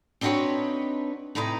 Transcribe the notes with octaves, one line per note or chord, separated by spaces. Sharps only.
C4 D4 D#4 F#4 B4 C#5
A2 C3 D#4 B4 A#5